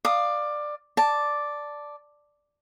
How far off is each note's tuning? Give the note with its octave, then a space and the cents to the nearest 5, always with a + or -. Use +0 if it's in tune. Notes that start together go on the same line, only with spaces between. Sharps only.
D5 +15 F5 +0 D#6 +0
D5 +0 A5 +0